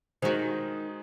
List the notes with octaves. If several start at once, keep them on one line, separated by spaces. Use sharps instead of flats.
D#3 G#3 D#4 F#4 G#4 C5